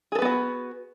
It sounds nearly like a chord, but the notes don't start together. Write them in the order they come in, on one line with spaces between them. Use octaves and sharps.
G#4 A4 B4 B3 F#4